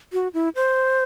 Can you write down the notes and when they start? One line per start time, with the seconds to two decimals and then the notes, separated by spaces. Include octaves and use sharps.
0.13 F#4
0.34 E4
0.55 C5